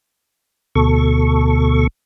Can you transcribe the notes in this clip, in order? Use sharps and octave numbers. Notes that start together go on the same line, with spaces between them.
D2 B2 A4 C#6